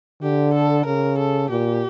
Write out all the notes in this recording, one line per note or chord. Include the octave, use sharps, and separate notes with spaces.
D3 G4
A4
C#3 A#4
A4
A#2 G4